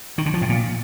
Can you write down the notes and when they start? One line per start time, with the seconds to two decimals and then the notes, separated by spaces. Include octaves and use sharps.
0.18 D#3
0.26 D3
0.34 F3
0.42 A2
0.49 A#2